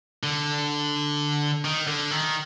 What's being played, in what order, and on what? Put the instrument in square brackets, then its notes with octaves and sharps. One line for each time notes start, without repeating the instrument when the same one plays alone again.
[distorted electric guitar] D3
D#3
D3
D#3